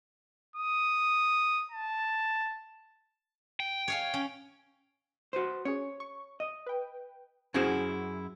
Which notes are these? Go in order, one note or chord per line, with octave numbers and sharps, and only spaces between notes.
D#6
A5
G5
C#5 F5 G#5
C#4
F#4 B4 C5
C#4 G#4 C#5
C#6
D#5
B4 G5
F#2 C#4 E4 F#4 G#4 C5